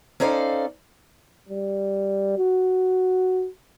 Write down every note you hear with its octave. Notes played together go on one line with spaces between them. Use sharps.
C#4 D#4 A4 C5 D5 F5
G3
F#4